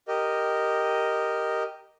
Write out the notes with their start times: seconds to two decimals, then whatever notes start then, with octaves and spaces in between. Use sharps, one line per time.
0.08 G4 A#4 D#5